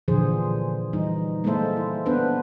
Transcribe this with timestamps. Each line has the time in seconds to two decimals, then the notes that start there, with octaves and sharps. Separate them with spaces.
0.08 A#2 D3 E3 F3 G#4 C5
0.93 E3 G3 D#4
1.44 G#3 A#3 E4 A4 C5 E5
1.77 E4
2.06 B3 D4 B4 C5